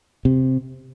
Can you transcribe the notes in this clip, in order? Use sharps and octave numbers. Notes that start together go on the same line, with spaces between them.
C3